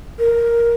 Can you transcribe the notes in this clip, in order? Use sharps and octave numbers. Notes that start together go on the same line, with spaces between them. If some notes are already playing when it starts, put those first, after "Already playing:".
A#4